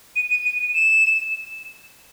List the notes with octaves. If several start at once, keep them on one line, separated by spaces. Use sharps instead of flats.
D#7
D#7
D#7
D#7
E7